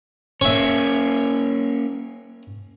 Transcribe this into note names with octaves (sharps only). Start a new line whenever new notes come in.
A#3 C#4 C#5 E5